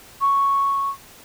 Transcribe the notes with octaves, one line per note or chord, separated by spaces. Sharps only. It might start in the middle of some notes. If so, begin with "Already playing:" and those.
C#6